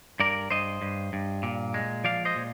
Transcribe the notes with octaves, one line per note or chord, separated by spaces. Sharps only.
G2 A#4 D5
G2 C5 D#5
G2
G2
A#2
G#3
F3 D5 F5
C5 D#5
A#2